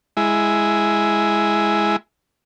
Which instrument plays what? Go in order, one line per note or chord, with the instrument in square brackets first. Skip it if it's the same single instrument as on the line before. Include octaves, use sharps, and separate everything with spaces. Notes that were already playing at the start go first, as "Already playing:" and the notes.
[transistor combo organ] G#3 E4